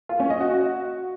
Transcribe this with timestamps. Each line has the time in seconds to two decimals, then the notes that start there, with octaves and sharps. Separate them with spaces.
0.09 F4
0.20 C#4
0.30 D#5
0.40 F#4